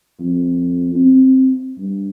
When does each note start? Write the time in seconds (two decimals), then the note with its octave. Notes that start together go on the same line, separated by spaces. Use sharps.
0.19 F2
0.95 C4
1.77 G2